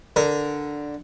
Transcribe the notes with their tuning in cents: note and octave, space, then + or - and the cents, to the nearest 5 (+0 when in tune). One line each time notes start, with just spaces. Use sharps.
D3 +0 A#4 +15